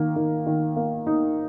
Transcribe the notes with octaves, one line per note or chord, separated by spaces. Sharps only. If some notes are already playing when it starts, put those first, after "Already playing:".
Already playing: D#3 A#3
D#3
D#3
A#3
D#4